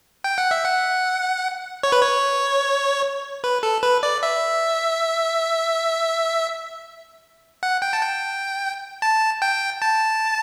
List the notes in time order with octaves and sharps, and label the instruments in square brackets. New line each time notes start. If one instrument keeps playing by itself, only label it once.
[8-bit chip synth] G5
F#5
E5
F#5
C#5
B4
C#5
B4
A4
B4
D5
E5
F#5
G5
A5
G5
A5
G5
A5